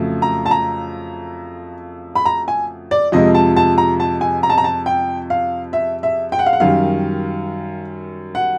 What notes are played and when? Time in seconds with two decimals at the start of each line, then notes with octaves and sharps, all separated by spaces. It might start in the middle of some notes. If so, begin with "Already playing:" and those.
Already playing: F2 C#3 F#3 A3
0.22 A#5
0.46 A5
0.51 A#5
2.15 B5
2.26 A#5
2.48 G#5
2.91 D5
3.12 F2 C3 F3 G#3 D#5
3.35 A5
3.56 A5
3.78 A#5
4.00 A5
4.21 G#5
4.43 A#5
4.50 A5
4.58 A#5
4.64 A5
4.86 G5
5.30 F5
5.73 E5
6.03 E5
6.32 G5
6.39 F#5
6.46 F5
6.53 F#5
6.60 F#2 D#3 G3 F5
8.35 F#5